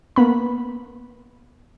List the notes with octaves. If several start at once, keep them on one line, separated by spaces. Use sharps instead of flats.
A#3 B3 B5